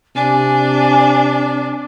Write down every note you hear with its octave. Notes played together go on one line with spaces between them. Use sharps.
C3 D4 G#5